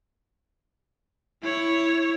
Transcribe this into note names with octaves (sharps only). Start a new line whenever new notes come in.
E4 C#5